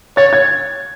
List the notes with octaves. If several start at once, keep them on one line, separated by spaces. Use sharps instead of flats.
C#5 A6
G#6